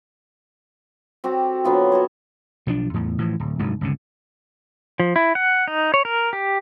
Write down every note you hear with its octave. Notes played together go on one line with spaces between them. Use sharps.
C4 F#4 G4 A4
D3 F#3 B3 F4
F#4 A4 C#5
B1 F3 G3 D4
E2 A2
A2 E3 F3
D1
F1 D2 G#2 F#3
G1 C#2 C#3
F3
E4
F#5
D#4
C#5
A#4
G4